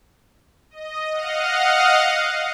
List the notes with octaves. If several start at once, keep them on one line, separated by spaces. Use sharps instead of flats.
D#5
D#5 F5 F#5